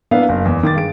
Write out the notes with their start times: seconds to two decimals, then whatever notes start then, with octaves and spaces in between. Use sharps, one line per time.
0.11 A#3 B3 D4 E4 E5 F5
0.29 F#1
0.45 E2
0.63 D#3 D6 A6
0.75 G2 G#4 D7